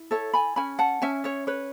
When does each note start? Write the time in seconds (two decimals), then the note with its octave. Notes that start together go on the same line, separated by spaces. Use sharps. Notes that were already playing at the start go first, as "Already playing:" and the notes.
Already playing: E4
0.11 A4 C#5 E5
0.34 G#5 B5
0.56 C#4 G#5 B5
0.79 F#5 A5
1.02 C#4 E5 G#5
1.24 C#5 E5
1.47 B4 C#5